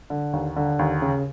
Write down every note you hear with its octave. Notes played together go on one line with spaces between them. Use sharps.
D3
D#2
D3
D#2
C#3